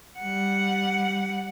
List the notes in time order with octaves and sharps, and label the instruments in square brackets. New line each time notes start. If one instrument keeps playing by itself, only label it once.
[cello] G3 F#5